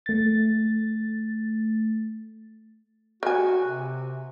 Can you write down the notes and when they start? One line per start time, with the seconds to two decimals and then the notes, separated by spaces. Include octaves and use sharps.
0.06 A3 A6
3.23 F#4 A#4 G#5
3.63 C3